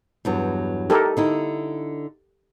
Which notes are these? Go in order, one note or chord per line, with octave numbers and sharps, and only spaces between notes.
E2 G2 F#3
D#4 G4 A4 A#4
D3 D#4 E4